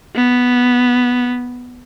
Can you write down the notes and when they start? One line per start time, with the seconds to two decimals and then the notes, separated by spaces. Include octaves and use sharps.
0.15 B3